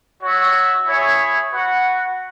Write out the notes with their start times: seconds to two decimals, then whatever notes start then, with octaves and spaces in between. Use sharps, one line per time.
0.21 F#4 C#5 E5
0.86 E4 G#4 C#5 E5
1.52 F#4 B4 F#5